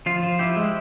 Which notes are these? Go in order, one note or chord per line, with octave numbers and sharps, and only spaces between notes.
F3 F4
F3
E4 G4
G#3